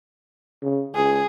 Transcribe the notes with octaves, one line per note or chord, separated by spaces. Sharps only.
C#3
C#2 G#4